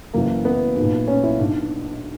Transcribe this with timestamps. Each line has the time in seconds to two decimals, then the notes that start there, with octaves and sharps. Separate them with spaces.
0.13 F#1 F#2 E3 A#3
0.45 B3
0.76 B1
0.82 A#2
1.08 C#4
1.24 E4
1.39 B1 B2 D4